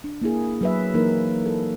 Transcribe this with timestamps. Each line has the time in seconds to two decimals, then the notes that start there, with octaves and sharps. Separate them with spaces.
0.04 D4
0.22 A#3 E4 G#4
0.61 F#3 B4 E5
0.94 E3 A#3 D#4 A#4
1.46 A4